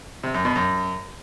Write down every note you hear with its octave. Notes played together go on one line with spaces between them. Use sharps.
C3
F#2
B2
F#2